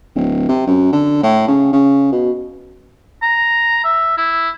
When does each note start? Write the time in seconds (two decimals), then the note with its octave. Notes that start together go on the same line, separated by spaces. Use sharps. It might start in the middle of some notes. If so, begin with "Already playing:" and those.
0.15 D1
0.48 C3
0.67 F#2
0.92 D3
1.23 A2
1.48 C#3
1.73 C#3
2.12 B2
3.22 A#5
3.84 E5
4.17 E4